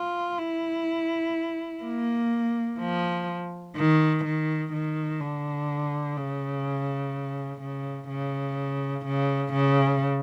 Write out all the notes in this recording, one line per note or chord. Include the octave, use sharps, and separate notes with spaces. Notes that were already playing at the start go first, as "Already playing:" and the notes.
Already playing: F4
E4
A#3
F3
D#3
D#3
D#3
D3
C#3
C#3
C#3
C#3
C#3